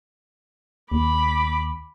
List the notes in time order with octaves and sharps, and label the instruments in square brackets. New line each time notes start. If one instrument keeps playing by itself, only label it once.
[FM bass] D#2 [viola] B5 D6